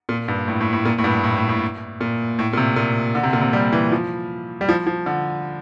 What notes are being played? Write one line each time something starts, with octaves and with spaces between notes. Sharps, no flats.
A#2
G2
A2
A2
A2
A#2
A2
G2
A2
A2
A2
A#2
A2
A#2
C3
A#2
D3
C3
A#2
C3
G3
E3
F3
G3
F3
F3
D3